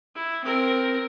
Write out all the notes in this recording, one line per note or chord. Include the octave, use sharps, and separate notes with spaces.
E4
C4 A#4